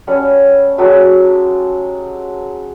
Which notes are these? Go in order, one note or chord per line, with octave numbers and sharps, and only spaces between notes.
G3 A3 C#4 F#5
F#3 G#3 A3 G4